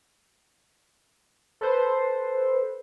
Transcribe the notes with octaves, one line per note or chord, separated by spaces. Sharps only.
A4 B4 C5